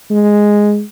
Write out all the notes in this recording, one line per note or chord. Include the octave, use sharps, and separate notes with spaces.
G#3